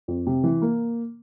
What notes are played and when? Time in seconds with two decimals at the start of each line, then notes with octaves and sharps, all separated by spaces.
0.08 F2
0.27 C3
0.44 E3
0.62 A#3